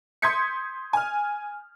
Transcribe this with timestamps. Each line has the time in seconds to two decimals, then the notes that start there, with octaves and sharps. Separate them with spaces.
0.22 C6 D#6 G6 G#6 B6 C#7
0.93 G#5 F6